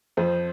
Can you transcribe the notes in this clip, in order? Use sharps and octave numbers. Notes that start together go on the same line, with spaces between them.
F2 F3 C5